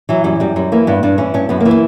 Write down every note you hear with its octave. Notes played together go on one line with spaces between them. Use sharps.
E3 F#3
F#2 G3
F#2 G3
F#2 G3
E3 A#3
G2 B3
G2 D4
E3 C#4
G2 C#4
F#2 B3
A#3
E3
A#3